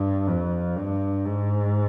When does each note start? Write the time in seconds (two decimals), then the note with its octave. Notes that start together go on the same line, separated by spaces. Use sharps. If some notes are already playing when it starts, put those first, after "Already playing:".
Already playing: G2
0.27 F2
0.76 G2
1.25 G#2